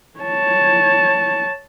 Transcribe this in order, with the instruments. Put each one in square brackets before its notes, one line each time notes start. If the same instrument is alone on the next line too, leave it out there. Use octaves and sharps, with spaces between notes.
[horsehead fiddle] C#5 A5